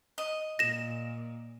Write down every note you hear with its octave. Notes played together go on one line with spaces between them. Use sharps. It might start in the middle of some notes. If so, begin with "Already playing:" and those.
D#5
A#2 A#6 E7